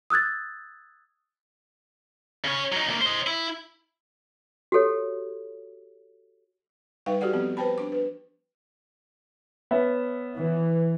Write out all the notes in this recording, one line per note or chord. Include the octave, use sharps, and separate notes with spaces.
D#6 E6 F#6 G#6 A6
C#3 C#5
F#3 D#4
D2 A#3
C5 D#5
E4
F#4 G4 A4 C#5
G3 D#4 B4 E5 F5 G5
F#4 G4 A4 D5 F#5
F3 B3 C4 G4
B4 C5 G5 A5 B5
D4 D6
B4
B3 C#4 E5
E3